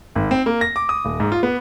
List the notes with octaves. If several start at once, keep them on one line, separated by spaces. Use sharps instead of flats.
G#1
C4
A#3
A#6
D6
D#6
D#1
G#2
F4
B3